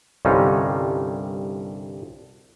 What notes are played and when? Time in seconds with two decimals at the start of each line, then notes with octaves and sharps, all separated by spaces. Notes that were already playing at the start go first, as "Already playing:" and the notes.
0.25 C2 G2 D3 C#4 D#4 F4